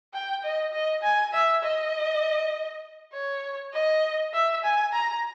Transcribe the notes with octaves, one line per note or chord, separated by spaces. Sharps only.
G5
D#5
D#5
G#5
E5
D#5
C#5
D#5
E5
G#5
A#5